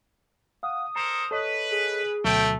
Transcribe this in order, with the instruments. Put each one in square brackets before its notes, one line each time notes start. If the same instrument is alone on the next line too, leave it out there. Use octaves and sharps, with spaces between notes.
[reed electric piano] F5 F#5 [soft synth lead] D#6
[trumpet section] A4 A#4 C5 [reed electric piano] A#5
[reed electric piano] A4 C#5 D#5 [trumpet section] B4
[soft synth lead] G#4
[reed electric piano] D2 B2 [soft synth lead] F#3 [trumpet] A3 [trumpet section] G5